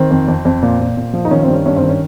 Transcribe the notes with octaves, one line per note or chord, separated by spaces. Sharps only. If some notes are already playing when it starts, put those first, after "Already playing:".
Already playing: D#3 C4
F2
F2
F2
A#2
A#2
A#2
F3
D#4
D#3 C#4
G2 C4
C#4
G2 C#4
C4
D#3
C#4